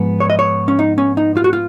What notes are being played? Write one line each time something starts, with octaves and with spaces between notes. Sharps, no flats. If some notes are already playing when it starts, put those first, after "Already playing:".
Already playing: G#2 F3 B3
C#5
D#5
C#5
C#4
D#4
C#4
D#4
F4
F#4
F4